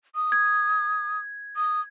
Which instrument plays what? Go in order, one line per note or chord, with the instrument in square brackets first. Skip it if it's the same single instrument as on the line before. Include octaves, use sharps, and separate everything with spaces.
[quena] D#6
[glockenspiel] G#6
[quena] D#6